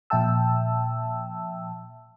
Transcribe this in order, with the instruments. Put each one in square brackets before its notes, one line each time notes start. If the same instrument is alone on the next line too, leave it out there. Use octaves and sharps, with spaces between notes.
[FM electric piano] A#2 F3 E5 G5 A5 E6